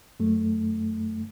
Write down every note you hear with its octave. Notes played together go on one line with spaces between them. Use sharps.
F#2 A3